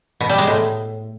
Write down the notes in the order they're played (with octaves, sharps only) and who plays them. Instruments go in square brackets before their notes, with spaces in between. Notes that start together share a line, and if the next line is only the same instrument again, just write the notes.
[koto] B2
G3
G#3
A2